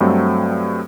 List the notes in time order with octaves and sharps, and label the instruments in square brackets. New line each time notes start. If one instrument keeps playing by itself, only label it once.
[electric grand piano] G2 F#3 A3 C4